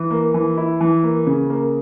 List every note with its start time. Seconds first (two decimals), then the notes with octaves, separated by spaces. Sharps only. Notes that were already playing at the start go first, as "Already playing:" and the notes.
Already playing: E3
0.11 A#3
0.34 E3
0.57 E4
0.81 E3
1.03 A#3
1.27 C#3
1.50 A#3